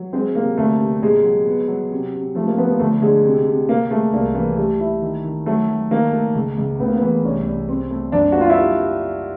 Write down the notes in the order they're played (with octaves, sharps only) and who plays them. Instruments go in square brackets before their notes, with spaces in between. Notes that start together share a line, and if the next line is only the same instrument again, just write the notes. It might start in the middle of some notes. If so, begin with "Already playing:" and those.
Already playing: [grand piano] F#3
[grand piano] G#3 [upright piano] C4
[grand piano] C3 [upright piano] A#3
[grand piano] D2 [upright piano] A3
[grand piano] C3
[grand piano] A#2 [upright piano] G#3
[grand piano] F#3
B3
F#3
C3
C3
[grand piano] F3 [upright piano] A3
[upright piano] A#3
[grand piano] F3 [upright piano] B3
[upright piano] A#3
[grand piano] D2 [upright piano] A3
[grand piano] D3 [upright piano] G#3
[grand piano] C3
C3
[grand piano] C3 [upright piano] A#3
[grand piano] G#3 [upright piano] A3
[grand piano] C2 [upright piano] A#3
[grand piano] E3 [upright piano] A#3
[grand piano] G3 [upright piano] A3
[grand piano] E4
D#3
D#3
[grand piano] F#3 [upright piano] A3
[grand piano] F#3
[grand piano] D#3 [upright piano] A#3
[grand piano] A3
C#2
C#2
[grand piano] A2 [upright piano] B3
[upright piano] A#3
B3
[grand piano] E3
[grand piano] C2 [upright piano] C#4
[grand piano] C2
C4
A3
[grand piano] F#2 [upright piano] D4
[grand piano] A#3 [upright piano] F#4
[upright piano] F4
E4
[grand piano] G3